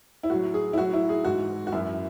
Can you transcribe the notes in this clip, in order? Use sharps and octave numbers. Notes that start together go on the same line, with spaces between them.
E4
A2 F#3 F#4
G#4
E4
A2 F#3 F#4
E4
G#4
G#2 E3 F#4
F#4
F#2 E3 E4